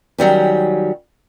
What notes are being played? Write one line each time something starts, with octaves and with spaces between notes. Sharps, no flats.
D#3 F#3 G3 C#4